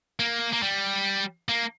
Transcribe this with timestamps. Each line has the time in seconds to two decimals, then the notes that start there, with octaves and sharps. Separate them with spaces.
0.20 A#3
0.53 A#3
0.63 G3
1.49 A#3